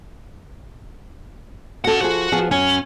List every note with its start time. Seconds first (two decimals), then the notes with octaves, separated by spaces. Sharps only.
1.84 C#4 F#4 A4 F#5
2.01 F3 F#4 G#4
2.32 F3 B3 G#4
2.51 F#2 C#4 G#5